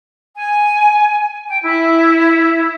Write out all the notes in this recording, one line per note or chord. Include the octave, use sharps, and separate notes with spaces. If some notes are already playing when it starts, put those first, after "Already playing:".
G#5
G5
E4